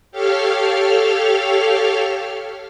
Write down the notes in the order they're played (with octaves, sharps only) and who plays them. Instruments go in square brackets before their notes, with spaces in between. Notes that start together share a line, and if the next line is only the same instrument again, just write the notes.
[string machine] G4 A4 C#5 F5 F6